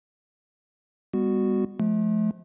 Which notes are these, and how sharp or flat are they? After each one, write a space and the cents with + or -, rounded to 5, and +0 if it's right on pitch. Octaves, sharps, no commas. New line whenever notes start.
G3 +35 B3 +0 F#4 +0
F3 +0 A3 -40